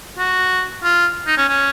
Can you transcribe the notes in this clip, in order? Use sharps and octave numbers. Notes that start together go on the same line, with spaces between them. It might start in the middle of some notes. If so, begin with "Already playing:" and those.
F#4
F4
D#4
C#4
C#4